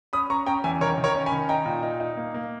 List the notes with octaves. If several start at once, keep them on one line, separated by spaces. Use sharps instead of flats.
C#4 B5 D#6
C#4 A#5 C#6
C#4 G5 A#5
E2 E5 G#5
D#3 A#4 C#5
D#3
A#4 C#5
C#4
G#5 B5
D#3
D#4 G5 A#5
A#2
D#4
D#4
A#3
A#3